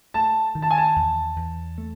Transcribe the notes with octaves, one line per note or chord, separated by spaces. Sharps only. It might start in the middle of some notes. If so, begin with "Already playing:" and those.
A3 A5
D#3
A5
G#5
A5
E2
E2
A3